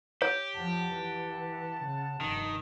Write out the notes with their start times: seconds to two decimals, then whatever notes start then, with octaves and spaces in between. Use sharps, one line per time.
0.22 G4 C#5
0.55 F2 F3 F#5 A5
0.93 E3
1.84 C#3
2.21 F1 G2 D#3